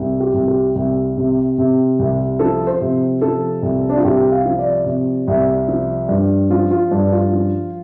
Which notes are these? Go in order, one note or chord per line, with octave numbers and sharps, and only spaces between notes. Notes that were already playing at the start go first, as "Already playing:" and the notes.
Already playing: C2
G4
C2
G4
C2
C3
C3
C2
F3 A4
C5
C3
F3 A4
C2
D4
F4
C2 G4
F5
F3
D5
C3
C2
F3
G2
F3 F4
F4
G2 D4
F4
F3